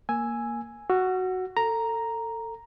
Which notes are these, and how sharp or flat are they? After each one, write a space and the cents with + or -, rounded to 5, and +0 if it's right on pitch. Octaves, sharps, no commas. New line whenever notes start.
A#3 +0 G#5 +0 E6 +0
F#4 +0 E6 +40
A4 +25 A#5 +0